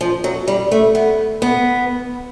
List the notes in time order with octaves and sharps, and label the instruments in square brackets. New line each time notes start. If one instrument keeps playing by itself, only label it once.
[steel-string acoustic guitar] F3
F#3
G3
A3
B3
B3